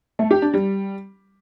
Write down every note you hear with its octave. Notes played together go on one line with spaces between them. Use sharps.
A3
G4
D4
G3